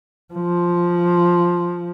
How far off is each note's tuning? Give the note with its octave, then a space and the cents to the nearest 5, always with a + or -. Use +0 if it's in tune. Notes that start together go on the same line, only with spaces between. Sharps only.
F3 +0